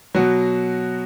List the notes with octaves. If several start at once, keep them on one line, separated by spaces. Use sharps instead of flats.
B2 F#3 F#4